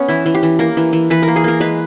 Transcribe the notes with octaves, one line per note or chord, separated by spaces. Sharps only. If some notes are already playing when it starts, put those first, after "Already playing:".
Already playing: B3 C#4
E3 E4
E3
G4
E3
A#3 A#4
E3
E3
E3 B4
A#4
A#3
G#4
A#3 A#4
G#3 B4